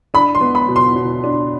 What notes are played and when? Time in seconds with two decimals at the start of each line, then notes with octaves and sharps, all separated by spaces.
0.14 D4 B5
0.35 C6
0.41 B3
0.55 B5
0.68 B2
0.76 C6
0.96 B2
1.24 D4